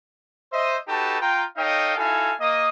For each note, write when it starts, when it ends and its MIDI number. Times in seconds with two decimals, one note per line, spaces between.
0.51 0.76 72
0.51 0.76 75
0.51 0.76 76
0.87 1.20 63
0.87 1.20 66
0.87 1.20 67
0.87 1.20 69
0.87 1.20 71
0.87 1.20 81
1.21 1.43 65
1.21 1.43 79
1.21 1.43 82
1.57 1.94 63
1.57 1.94 69
1.57 1.94 73
1.57 1.94 75
1.57 1.94 77
1.57 1.94 79
1.97 2.32 63
1.97 2.32 64
1.97 2.32 66
1.97 2.32 69
1.97 2.32 77
1.97 2.32 80
2.40 2.69 58
2.40 2.69 75
2.40 2.69 87